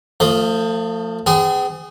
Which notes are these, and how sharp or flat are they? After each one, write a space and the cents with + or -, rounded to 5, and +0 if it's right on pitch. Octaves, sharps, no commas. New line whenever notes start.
F3 +0 A3 +35 D#5 +0
C4 -45 G#4 -15 D#6 +30